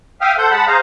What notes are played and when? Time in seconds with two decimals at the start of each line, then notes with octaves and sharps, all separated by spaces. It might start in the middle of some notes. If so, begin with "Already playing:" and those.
0.21 E5 F5 G5 D#6 F6
0.38 A4 C5 F#5 G6
0.51 G#3 F#5 A5 B5
0.67 G#4 C5 F5 A#5